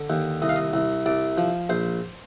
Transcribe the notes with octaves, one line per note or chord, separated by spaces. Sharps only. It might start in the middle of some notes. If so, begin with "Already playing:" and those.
Already playing: D3
D#2
C2 D#5
F5
D#5
C2
C2 D5
F3
A#1 C5